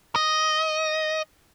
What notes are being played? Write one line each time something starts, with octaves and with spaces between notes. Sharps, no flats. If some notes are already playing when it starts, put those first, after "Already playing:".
D#5